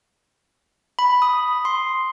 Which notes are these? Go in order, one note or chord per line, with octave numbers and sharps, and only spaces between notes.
B5
D#6
C6